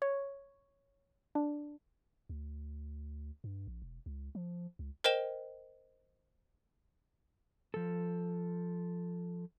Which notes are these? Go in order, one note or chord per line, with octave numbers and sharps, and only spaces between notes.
C#5
D4
D2
G2
A#1
E1
C#2
F3
C#2
A#4 C5 D#5 G5 E7 G7
F3 A4